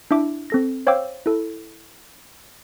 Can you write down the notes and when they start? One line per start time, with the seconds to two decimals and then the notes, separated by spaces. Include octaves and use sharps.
0.11 D4 E4 E5 D6
0.50 C4 A4 A#6
0.87 C5 C#5 F5 G5 D6 E6
1.26 E4 A4